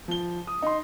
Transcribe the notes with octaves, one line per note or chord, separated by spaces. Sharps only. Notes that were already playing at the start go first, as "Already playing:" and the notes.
F3 G7
D#6
D#4 C6